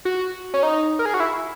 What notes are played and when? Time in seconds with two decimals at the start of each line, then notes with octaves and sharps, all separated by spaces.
0.05 F#4
0.54 C#4
0.63 D#4
0.99 A#4
1.05 G#4
1.14 F#4
1.20 E4